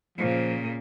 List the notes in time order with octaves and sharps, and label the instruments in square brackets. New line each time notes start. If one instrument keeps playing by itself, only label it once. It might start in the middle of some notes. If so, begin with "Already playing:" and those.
[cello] A#2 C#3 [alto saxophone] F3